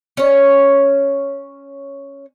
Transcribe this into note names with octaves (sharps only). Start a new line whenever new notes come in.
C#4 C#5